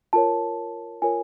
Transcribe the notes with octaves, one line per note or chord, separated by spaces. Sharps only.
F4 A#4 C#5 A5
F4 A#4 C#5 G#5